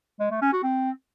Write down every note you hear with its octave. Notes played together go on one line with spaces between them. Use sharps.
G#3
A3
C#4
F#4
C4